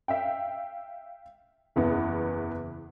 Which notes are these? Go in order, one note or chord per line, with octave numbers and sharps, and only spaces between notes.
E5 F5 G5
F#1 E2 E3 B3